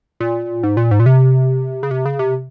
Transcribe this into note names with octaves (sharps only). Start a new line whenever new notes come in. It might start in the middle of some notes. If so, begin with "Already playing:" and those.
A#2
G#2
A#2
G#2
A#2
C3
C#3
C3
C#3
C3